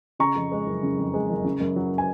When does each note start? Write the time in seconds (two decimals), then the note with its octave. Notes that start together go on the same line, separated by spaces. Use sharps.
0.19 C#3 A#5 C#6
0.36 F2
0.52 G#3
0.67 F#1
0.83 C#3
0.98 F2
1.14 G#3
1.29 F#1
1.44 C#3
1.60 F#2
1.76 F#3
1.98 G#5